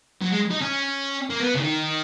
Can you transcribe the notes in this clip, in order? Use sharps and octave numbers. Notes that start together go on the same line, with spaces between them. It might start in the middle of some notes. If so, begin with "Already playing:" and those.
F#3
G#3
D#4
C#4
A#3
B3
C#3
D#3